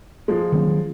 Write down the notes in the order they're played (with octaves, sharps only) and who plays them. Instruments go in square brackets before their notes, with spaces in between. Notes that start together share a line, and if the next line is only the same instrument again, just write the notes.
[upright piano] F3 G#3
[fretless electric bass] D#3 F#3 A#3 C#4